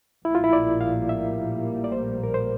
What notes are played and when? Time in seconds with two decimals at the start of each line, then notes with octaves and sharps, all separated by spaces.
0.24 A#1 A2 G3 A#3 E4
0.35 F4
0.44 E4
0.53 D5
0.81 F5
1.09 E5
1.84 D5
1.92 C5
2.23 A#4
2.34 C5